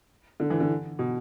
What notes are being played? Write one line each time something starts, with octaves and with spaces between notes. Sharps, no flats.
D3
E3
D3
B2